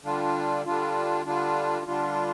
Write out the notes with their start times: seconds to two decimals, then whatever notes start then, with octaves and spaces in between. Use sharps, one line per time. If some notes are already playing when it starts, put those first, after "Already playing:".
0.03 D3 G3 D4 F4
0.65 D3 G3 D4 F4
1.25 D3 G3 D4 F4
1.86 D3 G3 D4 F4